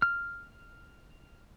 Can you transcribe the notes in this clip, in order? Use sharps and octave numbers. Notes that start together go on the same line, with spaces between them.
F6